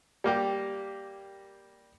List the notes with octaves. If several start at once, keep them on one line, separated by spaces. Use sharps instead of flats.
G3 A#3 G4